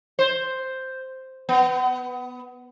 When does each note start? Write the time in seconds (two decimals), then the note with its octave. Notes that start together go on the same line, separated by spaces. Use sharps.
0.19 C5
1.49 B3